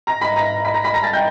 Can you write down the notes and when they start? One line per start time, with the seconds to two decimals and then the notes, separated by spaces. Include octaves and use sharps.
0.07 A#5 A#6
0.21 B5 B6
0.36 A#5 A#6
0.65 B5 B6
0.74 A#5 A#6
0.84 B5 B6
0.94 A#5 A#6
1.03 A5 A6
1.13 G5 G6